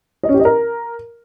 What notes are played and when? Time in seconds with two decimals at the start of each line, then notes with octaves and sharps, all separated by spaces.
0.23 D#5
0.29 C#4
0.34 G4
0.40 D#5
0.45 A#4